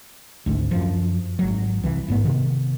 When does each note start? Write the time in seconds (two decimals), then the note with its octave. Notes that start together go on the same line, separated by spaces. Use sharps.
0.46 G#1 D2
0.71 F#2 F3
1.39 G#1 F#3
1.83 C2 E3
2.08 A1 G#2 B3
2.24 C3 D#3